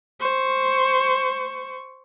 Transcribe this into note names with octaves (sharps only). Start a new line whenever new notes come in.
C5 C#6